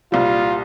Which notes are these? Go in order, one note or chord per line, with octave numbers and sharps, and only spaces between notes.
C2 A#2 G3 F4